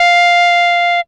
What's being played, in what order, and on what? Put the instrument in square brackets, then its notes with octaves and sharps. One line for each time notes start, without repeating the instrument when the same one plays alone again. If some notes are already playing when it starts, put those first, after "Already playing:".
Already playing: [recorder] F5